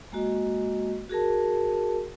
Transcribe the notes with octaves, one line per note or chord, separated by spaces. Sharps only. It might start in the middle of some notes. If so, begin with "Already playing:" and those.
G#3 A#3 F#4 D#5
F#4 G#4 A#4 A5